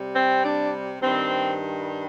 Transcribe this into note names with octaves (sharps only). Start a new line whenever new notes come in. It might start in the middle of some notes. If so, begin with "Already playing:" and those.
Already playing: C3 G3
C4
D4
G2 D#3 G3 C4